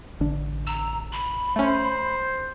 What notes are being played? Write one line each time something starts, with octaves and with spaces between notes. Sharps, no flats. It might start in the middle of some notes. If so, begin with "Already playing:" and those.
A1 D3 D4
A#5 E6
B5
A3 C#4 C5